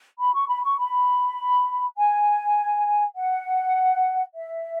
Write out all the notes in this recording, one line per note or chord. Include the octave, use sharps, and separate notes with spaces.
B5
C#6
B5
C#6
B5
G#5
F#5
E5